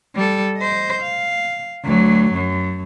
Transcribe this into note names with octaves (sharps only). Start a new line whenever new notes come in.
G3 A4
C5 D#5
F5
D2 F#3
F#2